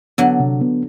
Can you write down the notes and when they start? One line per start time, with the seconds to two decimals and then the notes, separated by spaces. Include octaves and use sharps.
0.18 D3 F#3 B3
0.40 C3
0.61 B3